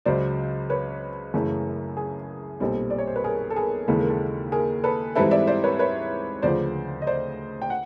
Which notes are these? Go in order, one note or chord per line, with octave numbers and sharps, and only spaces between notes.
C#2 C#3 F#3 C5 D5
B4 C#5
F#2 C#3 E3 A3
G#4
B1 A#2 G3 C4 A4
D5
C#5
C5
B4
G#4 A#4
A4
G#4 A#4
D#2 C#3 E3 G#3 A4
A#4
A4
G#4 A#4
A4 B4
G#2 E3 G3 C4 E4 A4 B4
D5 E5
C5 D5
B4 C#5
B4 C#5
D2 C#3 F3 C5 D5
D#5
C5 D5
G5
F#5